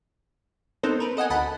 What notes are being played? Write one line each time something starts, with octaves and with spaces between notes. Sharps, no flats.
B3 C4 D#4 A4 A#4 C5
A#4 B4
A4 D#5 F#5 G#5
D2 D#5 F#5 A5 B5